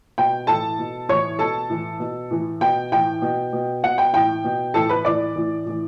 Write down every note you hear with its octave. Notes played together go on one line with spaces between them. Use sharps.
B2 G5
A2 E3 A4 A5
B2
A2 E3 C#5 C#6
B2 A4 A5
A2 E3
B2
A2 E3
B2 G5
A2 E3 G5
B2
B2
B2 F#5
G5
A2 E3 G5
B2
A2 E3 A4 A5
B4 B5
A2 E3 D5 D6
A2 E3
A2 E3